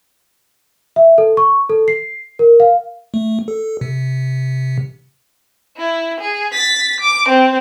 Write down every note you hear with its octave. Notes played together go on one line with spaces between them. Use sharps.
E5
A4
C#6
A4
C7
A#4
F5
A3
A4
C3
E4
G#4
A6 B6
D6
C4